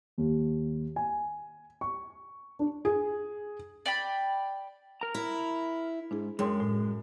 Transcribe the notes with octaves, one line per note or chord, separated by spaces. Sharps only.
D#2
G#5
C#6
D4
G#4
D5 G5 B5
A#4 A#5
E4
G#2 D4 E4 G#4
F#2 G#3 G#4 G5 C6
A2